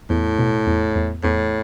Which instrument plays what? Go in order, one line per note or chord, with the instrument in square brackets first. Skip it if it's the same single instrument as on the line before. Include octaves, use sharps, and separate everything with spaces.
[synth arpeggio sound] E2 [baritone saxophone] A2
[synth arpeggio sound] B2
E2
E2
[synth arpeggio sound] E2 [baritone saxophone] A2